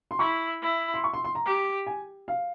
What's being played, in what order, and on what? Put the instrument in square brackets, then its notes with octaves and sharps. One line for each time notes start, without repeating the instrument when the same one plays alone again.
[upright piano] C6
[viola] E4 [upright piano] C#6
[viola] E4
[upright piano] C6
C#6
C6
C6
A#5
[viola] G4
[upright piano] G#5
F5